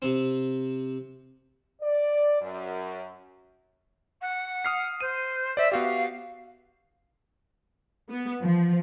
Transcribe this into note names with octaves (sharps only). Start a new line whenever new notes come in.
C3 C4
D5
F#2
F#5
D#6 F6 C7
C5 D#7
C5 D5 E5
B3 F#4 G4 F5
B3
F3